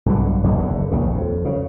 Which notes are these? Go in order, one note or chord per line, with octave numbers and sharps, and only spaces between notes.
B1 G2 B2 D3
B1 F2 B2 A#3
F#1 E2 B2 D3
A#1 D#2 C#3
F2
C#3